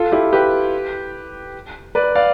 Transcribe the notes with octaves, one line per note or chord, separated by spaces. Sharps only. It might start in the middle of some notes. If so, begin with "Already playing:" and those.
Already playing: F4 A4
E4 G4
G4 B4
B4 D5
D5 F5